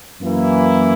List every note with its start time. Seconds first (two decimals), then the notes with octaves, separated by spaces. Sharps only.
0.21 F#2 E3 A#3 E4